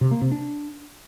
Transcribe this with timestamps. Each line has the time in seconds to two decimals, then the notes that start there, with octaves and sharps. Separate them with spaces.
0.01 C3
0.11 A#3
0.21 C3
0.32 D4